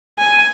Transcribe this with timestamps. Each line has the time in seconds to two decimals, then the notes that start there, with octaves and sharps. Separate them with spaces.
0.19 G#5